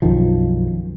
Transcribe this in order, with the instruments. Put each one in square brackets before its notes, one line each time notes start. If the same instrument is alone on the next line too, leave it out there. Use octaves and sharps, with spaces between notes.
[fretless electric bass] B1 F#2 D#3 F3